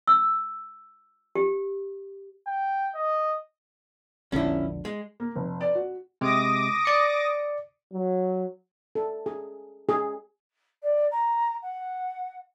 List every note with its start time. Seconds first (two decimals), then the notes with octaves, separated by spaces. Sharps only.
0.07 E6
1.35 G4
2.47 G5
2.95 D#5
4.32 E1 A#1 D3 C#4 E4
4.85 G#3
5.20 A#3
5.36 F1
5.61 D5
5.75 F#4
6.21 C3 G#3 D6 D#6 A#6
6.85 D5 C#7
7.92 F#3
8.95 A4
9.26 G#4
9.89 G#4
10.82 D5
11.11 A#5
11.62 F#5